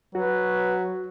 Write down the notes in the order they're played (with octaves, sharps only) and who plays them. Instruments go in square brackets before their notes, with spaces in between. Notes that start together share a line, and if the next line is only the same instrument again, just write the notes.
[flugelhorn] F#3 [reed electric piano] F#4 [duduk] B4